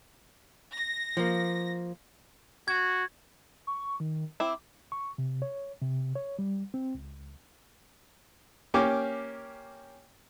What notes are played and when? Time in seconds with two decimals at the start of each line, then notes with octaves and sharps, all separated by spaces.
0.74 A#6
1.17 F3 A#3
2.68 F#4 G#6
3.67 C#6
4.00 D#3
4.40 C4 E4 D6
4.92 C#6
5.18 C3
5.42 C#5
5.81 C3
6.15 C#5
6.39 G3
6.74 C4
6.95 C#2
8.74 A#3 C#4 G4 D6